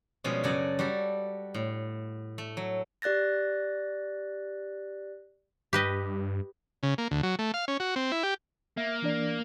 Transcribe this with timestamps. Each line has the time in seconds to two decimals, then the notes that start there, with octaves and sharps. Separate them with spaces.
0.24 B2 F3 G3 G#3 C#4
0.44 F#2 C#3 F#4 A4 D5
0.79 G3 F#4 G4 A4
1.54 A2
2.38 A3
2.57 F#3
3.02 G4 D5 F#6 A6 A#6
5.73 G2 G4 B4 D#5
6.83 C#3
6.98 A#3
7.11 D2
7.23 F#3
7.39 A3
7.54 F5
7.68 C#4
7.80 F#4
7.96 C4
8.12 E4
8.23 G4
8.77 A#3 E5
9.02 E3 D4 D5